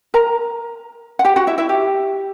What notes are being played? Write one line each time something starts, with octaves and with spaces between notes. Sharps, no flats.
A#4 A#5
F#5
G4 G5
F#4 F#5
E4 E5
E4 E5
G4